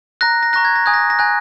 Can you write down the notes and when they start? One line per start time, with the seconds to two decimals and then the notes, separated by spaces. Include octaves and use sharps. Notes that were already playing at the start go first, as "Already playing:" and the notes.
0.21 A#5 F#6 A#6
0.43 A#6
0.53 A#5 C#6 F#6 A#6
0.65 G#6
0.75 A#6
0.86 G#5 D#6 F#6 G#6
0.94 A#6
1.10 A#6
1.19 G#5 F#6